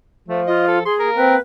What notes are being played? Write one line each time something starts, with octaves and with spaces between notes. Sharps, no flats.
F3 A3
F4 D#5
A4
G#4 C6
A#3 A#4
C4 B4